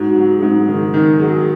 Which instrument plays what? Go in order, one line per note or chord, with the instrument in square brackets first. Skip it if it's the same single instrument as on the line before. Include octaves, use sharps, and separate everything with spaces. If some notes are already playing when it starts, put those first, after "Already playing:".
Already playing: [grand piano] G#2 [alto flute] F#4
[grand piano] F#3
[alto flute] G#4
[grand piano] G#2
[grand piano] D#3 [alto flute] G#4
[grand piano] D#3
F#3